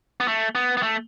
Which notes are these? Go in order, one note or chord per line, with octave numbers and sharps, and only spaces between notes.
B3
A3
B3
B3
A3